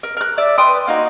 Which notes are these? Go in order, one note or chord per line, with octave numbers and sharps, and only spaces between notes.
A#4
A#4 F#6
D5 E5
B4 G5 C6 D#6
A#3 D#4 F#4